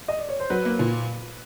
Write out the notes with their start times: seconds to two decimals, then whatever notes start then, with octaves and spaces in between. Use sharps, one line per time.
0.08 D#5
0.19 D5
0.29 C#5
0.40 C5
0.50 F#3 B4
0.65 A#3
0.79 A#2